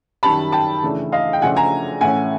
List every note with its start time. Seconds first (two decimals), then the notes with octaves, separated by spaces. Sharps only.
0.23 F#2 D#3 G3 A5 B5
0.52 G5 A5
0.83 C#3 E3 A3 D4
1.12 D#5 F5
1.33 G5
1.42 C#3 F3 A3 D4 F#5 G#5
1.56 G#5 A#5
2.01 A2 E3 A3 C#4 F#5 G#5